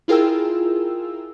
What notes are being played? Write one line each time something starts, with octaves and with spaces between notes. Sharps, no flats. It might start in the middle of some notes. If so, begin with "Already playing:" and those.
E4 F4 G#4 A#4 G5 E6